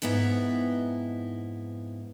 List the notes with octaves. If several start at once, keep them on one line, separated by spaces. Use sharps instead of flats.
F2 G#2 B3 D#4 E4